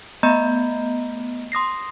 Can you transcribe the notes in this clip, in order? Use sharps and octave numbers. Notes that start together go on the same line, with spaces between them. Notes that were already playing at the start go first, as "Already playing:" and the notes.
A3 B3 D#5 A#5 B5 G6
C6 D#6 A#6 C7